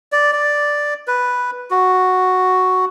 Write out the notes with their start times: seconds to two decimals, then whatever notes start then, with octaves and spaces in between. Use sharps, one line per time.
0.12 D5
0.33 D5
1.07 B4
1.71 F#4